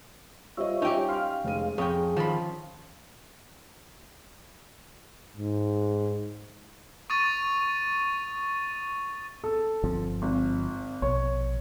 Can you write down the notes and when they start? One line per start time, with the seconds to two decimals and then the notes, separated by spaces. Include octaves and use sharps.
0.57 G3 F4 C5 C#5 D#5 E5
0.82 C#4 D#4 G4 G5
1.09 F5 C6 F6
1.44 F1 G#3 D#7
1.78 F2 C#4 G#4 G5 D#6
2.16 D#3 F3 B5
5.37 G#2
7.10 C#6 D#6 A6 D#7
9.44 A4
9.83 G1 F3 C4
10.22 G#1
11.02 A#1 B2 C#5